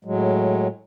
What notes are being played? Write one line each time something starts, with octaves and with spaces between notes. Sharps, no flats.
A2 F#3 G#3